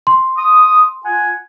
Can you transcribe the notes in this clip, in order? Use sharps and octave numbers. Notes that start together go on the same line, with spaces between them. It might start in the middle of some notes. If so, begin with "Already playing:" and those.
C6
D#6
F4 F#5 G#5